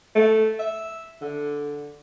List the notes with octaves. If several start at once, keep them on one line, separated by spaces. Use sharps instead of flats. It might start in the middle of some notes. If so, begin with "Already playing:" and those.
A3
E5
D3